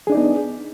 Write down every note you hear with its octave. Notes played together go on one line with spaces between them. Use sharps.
B3 D4 D#4 G#4 D5